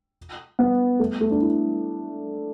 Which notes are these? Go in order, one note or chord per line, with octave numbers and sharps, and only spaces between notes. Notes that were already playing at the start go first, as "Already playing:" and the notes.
B3
A3
A3
D4
E4